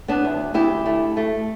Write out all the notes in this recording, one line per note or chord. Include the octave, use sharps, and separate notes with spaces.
B3 D4
D2
D2 E4 G4
A3
A3